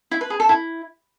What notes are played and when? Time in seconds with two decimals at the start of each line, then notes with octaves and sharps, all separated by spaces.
0.11 E4
0.21 B4
0.30 G#4
0.40 A4
0.49 E4